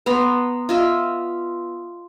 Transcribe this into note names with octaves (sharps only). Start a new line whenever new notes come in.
B3 A#5 C6
F4 D#5 E5